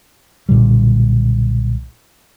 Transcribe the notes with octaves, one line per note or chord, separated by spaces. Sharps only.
B1 A#2 D3 G3